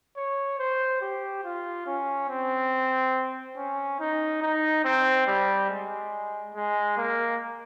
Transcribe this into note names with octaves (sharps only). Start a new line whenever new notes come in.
C#5
C5
G4
F4
C#4
C4
C#4
D#4
D#4
C4
G3
G#3
G#3
A#3